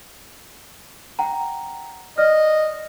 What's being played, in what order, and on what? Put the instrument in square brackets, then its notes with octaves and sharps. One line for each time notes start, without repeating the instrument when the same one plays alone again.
[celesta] F#5 G5 A#5
[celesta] D5 F6 [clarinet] D#5